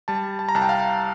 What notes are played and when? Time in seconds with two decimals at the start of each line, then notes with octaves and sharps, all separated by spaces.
0.08 G3 A5
0.39 A5
0.49 A#5
0.55 C2 A5
0.62 G5
0.69 F5